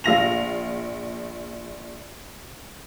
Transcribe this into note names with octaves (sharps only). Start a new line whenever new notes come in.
A#1 F5 A#6 F7